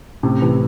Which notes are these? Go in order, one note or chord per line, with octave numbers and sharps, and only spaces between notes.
A2 C3
C3 E3